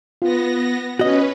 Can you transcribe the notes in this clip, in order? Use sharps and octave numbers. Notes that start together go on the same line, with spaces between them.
B3 F4 A#6
C#4 F#4 B4 D#5